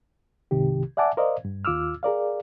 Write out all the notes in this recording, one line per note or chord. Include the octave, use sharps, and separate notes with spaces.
C2 G#2 C3 D#3 G4
D5 E5 F#5 G#5 A5 D6
A#4 C5 D5 D#5 F5
G2
D#2 F4 D6 E6 F6
G#4 A#4 D5 F5